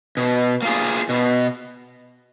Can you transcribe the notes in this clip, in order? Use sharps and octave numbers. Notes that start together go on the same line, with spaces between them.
B2
A#3 F4 G#4
B2